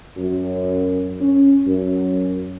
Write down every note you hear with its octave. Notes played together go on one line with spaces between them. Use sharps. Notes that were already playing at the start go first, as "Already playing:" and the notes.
F#2
C#4
F#2